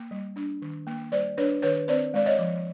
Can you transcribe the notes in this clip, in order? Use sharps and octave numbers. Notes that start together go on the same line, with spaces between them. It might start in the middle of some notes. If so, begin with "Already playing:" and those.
Already playing: A#3
G3
D4
D#3
A#3
G3 C5 D5
D4 B4 C#5
D#3 B4 C#5
C4 C5 D5
G#3 D5
C#5 D#5
F3